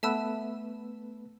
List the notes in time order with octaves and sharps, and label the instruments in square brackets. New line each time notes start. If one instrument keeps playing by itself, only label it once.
[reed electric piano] A3 B3 B4 [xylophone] E5 A5 E6